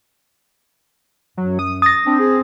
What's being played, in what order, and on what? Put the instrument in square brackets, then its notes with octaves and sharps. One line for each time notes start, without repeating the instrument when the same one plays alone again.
[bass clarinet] F#2 [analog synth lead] F#3
[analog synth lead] D#6
[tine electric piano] D#6 A#6 [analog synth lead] A6
[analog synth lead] C4 [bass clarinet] D4
[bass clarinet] G#4